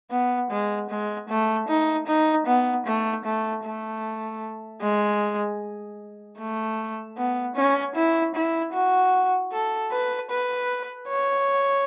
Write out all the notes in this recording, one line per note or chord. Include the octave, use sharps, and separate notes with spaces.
B3
G#3
G#3
A3
D#4
D#4
B3
A3
A3
A3
G#3
A3
B3
C#4
E4
E4
F#4
A4
B4
B4
C#5